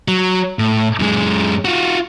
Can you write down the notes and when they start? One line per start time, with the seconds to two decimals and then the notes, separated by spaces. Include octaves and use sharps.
0.08 F#3
0.59 A2
1.00 F#2 G#3
1.65 F4 F#4